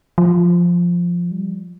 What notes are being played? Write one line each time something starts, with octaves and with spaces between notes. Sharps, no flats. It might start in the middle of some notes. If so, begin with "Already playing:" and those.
F3
G3